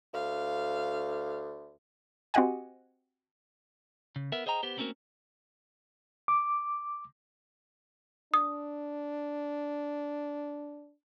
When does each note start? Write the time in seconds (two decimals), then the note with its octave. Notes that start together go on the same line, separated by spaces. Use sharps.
0.14 D2 F5
2.34 C4 F#4 G4 D#5 F#5 G#5
4.16 C#3
4.32 B3 A#4 E5
4.46 G#4 C5 D#5 G5 A#5
4.63 B3 G4 C5
4.77 A3 A#3 C4 C#4 F#4 A#4
6.28 D6
8.34 D4 D#6